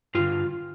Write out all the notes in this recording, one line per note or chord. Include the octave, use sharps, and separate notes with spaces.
G2 D3 F4